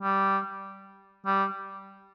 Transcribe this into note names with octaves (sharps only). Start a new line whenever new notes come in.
G3
G3